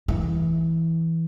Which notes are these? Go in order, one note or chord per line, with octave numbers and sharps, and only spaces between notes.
E3